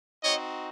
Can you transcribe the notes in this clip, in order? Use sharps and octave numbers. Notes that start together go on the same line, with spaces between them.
C4 D#4 F#4 C#5 D#5